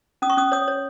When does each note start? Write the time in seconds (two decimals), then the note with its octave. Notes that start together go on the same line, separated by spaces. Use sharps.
0.22 C#4 D#6
0.30 C#6
0.37 C#4 D#6
0.52 C#5 D#6
0.68 C#5